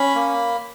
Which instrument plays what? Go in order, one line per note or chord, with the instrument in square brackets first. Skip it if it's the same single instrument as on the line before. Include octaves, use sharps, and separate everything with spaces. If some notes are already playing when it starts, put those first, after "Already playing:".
Already playing: [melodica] C#4 B5
A#3